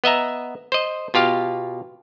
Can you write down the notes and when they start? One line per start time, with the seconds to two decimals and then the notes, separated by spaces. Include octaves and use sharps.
0.04 B3 D#5 E5 A#5
0.72 C5 D#5
1.14 B2 F4 G4 F5